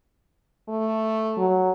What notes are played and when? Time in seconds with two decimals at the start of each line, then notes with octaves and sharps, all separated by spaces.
0.68 A3
1.38 F#3